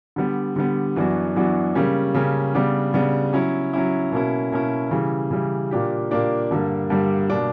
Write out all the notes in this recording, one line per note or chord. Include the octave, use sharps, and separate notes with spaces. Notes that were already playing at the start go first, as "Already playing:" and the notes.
D3 G3 B3
D3 G3 B3
F#2 E3 B3 D4 F#4
F#2 E3 B3 D4 F#4
C#3 G3 A#3 C#4
C#3 G3 A#3 C#4
C#3 G3 B3 D4
C#3 G3 B3 D4
F#3 C#4 E4
F#3 C#4 E4
B2 A#3 C#4 E4
B2 A#3 C#4 E4
C#3 E3 G3
C#3 E3 G3
A#2 A#3 D4 G4
A#2 A#3 D4 G4
G2 D3 G3 A#3
G2 D3 G3 A#3
B2 A#3 D4